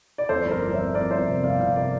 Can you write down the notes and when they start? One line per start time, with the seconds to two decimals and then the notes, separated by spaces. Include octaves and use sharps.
0.18 D5
0.29 F2 A4 C5
0.46 G1
0.51 A#4 D5
0.62 G1
0.73 C5 E5
0.78 F2
0.94 F2 A#4 D5
1.11 G1 C5 E5
1.27 C3
1.43 G1 D5 F5
1.60 C3 D5 F5
1.76 A#4 D5